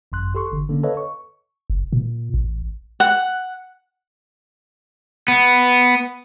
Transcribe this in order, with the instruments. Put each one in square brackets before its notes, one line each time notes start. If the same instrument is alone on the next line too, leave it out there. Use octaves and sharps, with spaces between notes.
[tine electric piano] G#1 F#2 C6 F#6
G4 A4 C6 C#6
G1 D3
D3 A#3 C#4
A4 B4 C#5 D#5 F5
C#6
[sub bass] F#1
A#2
A1
[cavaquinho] F#5
[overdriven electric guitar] B3